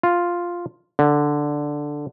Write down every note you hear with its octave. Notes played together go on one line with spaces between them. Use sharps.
F4
D3